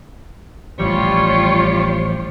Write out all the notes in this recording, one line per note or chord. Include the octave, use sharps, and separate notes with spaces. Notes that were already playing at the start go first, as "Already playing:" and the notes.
A1 F3 G3 F4 C#5